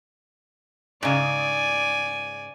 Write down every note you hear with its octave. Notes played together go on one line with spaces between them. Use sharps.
G#2 C#3 D5 G#5